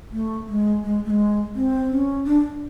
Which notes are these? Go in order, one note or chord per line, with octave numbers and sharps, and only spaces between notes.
A3
G#3
G#3
A3
G#3
C4
C#4
D4